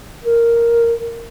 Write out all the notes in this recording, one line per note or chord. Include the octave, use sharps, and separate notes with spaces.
A#4